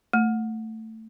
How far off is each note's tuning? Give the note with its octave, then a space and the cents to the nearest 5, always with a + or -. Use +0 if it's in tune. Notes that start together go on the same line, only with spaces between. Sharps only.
A3 +15